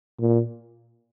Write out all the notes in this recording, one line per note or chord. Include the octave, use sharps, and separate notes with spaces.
A#2